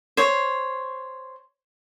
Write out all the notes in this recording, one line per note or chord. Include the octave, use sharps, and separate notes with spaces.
C5 C#5